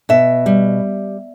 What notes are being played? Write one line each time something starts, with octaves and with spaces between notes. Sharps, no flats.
B2 E5
G3